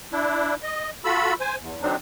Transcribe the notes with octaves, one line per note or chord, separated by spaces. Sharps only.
D4 E4
D#5
F4 F#4 A4 B5 E6
C5 G#5
E2
D3 F#3 C4 D4 D#4